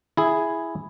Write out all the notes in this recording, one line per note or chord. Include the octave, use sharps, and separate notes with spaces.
E4 G#4